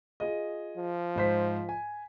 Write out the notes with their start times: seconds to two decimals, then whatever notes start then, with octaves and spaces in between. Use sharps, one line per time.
0.20 F4 G#4 D#5
0.77 F3
1.16 G#2 C5 B6
1.69 G#5